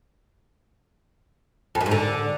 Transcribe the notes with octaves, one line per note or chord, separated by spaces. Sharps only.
F2
F#2
G#2
D3